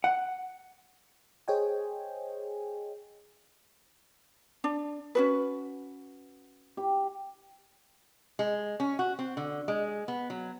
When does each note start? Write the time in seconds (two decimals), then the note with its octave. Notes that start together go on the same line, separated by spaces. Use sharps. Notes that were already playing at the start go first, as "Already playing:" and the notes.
0.04 F#5
1.48 G#4 C5 C#5 D#5 G5 G#5
4.64 D4
5.15 C#4 F#4 B4
6.77 G4 G5
8.39 G#3
8.80 C#4
8.99 F#4
9.19 C4
9.37 D3
9.68 G#3
10.08 B3
10.30 F#3